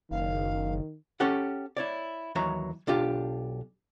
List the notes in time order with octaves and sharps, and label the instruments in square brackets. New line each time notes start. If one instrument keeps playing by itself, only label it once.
[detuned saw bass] F#1 [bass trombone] D#3 [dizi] F5
[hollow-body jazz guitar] C#4 G4 A4 F#5
E4 C#5 D5
D#2 E3 F#3 C#5 A#5
B1 D4 F4 G4